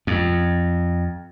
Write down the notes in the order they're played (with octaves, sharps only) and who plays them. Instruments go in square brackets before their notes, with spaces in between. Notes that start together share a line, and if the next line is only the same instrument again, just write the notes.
[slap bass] F2